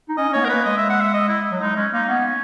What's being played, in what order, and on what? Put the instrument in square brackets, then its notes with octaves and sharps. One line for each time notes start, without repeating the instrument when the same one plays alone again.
[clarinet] D#4
[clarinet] C#4 [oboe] D#5
[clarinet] C#4
[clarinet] A#3 [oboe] C#5
[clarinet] B3
[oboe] A#4
[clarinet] A#3 [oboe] B4
[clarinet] G#3 [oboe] D#5
[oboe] E5
F#5
E5
D#5
E4
[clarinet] F#3
[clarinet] G#3 [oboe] D#4
[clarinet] G#3 [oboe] C#4
[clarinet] A#3 [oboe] D#4
[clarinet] B3 [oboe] C#4